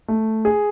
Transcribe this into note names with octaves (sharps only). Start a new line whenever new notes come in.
A3
G#4